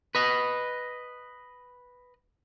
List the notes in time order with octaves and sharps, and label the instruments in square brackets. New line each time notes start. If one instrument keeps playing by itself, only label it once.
[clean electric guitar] B4 D#5